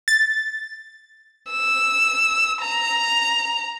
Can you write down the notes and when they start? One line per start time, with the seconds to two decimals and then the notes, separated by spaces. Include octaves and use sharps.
0.08 A6
1.51 E6
2.61 A#5